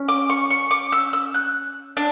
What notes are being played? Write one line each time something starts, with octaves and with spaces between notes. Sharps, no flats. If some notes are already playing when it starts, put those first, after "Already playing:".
Already playing: C#4
D6
C#6
C#6
D6
E6
E6
F#6
D4